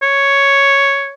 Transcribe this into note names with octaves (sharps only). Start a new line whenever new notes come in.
C#5